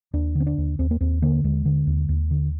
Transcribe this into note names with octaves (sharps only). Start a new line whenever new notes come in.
D#2 D4
D3
C4
D4
D#2
D#2 C4
A#3
D#2 C4
D3 A#3
D#2 G#3
D3
D#2
D#2
D3